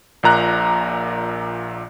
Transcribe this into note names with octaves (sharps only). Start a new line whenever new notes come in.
A#1 A#2 A#5 F#6